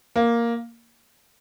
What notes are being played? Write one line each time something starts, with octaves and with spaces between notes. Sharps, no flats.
A#3